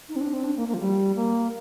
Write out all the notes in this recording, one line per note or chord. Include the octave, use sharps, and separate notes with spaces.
D#4
C4
D4
C4
D4
A#3
A#3
F3
G3
A#3